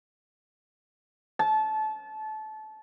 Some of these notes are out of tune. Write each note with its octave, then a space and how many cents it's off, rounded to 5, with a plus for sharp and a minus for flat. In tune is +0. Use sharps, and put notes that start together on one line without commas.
A5 -25